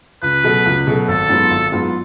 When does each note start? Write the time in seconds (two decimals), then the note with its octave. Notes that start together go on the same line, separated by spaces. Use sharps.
0.22 C#2 B4
0.44 B2 F#3 A3
0.66 C#2
0.87 B2 F#3 A3
1.08 G#1 A4
1.29 G#2 F#3 B3 F4
1.50 G#1
1.72 G#2 F#3 B3 F4